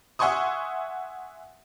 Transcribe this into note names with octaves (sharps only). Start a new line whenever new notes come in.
E5 F#5 G#5 C6 C#6 D#6